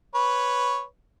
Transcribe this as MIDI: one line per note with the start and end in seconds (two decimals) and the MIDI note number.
0.15 0.83 71
0.15 0.83 73